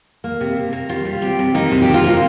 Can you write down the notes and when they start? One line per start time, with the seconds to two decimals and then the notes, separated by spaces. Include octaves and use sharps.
0.24 A#3
0.41 C3
0.56 C3
0.73 A#3
0.89 G3 F4
1.05 G3
1.22 C3 G4
1.39 C3
1.54 A#3 D#4
1.72 C3
1.82 G4
1.88 C3
1.94 F4
2.04 A#3 D#4